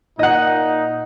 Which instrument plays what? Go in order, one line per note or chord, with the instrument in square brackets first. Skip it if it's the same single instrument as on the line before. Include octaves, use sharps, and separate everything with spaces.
[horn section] A#2 D#4 [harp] D#5 F#5